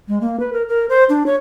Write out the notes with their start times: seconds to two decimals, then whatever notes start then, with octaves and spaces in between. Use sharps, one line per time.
0.08 G#3
0.21 A#3
0.40 B4
0.53 A#4
0.69 A#4
0.89 C5
1.09 D4
1.26 C#5